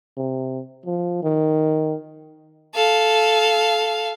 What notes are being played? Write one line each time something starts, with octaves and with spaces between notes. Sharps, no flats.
C3
F3
D#3
A4 F5